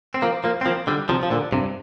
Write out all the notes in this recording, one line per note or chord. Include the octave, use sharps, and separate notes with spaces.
C4
F3 A#3
F3 A#3
C4
F3 A#3
D3 G3
C3 F3
F3
A#2 D3
G2 C3